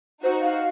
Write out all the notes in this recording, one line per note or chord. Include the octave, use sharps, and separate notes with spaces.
D#4 F#4 C5
F5